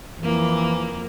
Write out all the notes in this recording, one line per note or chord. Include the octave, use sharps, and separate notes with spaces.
F2 E3 A#3